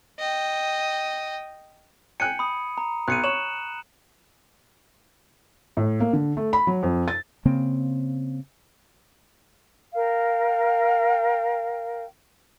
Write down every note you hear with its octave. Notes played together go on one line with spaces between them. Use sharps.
D#5 G5
G5 G#5 F#6 C#7 D#7
B5 D#6
A#5
B1 F#6 C#7 D#7
C#5 E7 F#7
A2
A#3
D3
A3
B5
F#3
F2
A6
C#3 A#3 C4
A#4 F5 G5